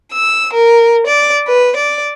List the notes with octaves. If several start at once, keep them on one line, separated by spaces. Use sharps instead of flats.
E6
A#4
D5
B4
D5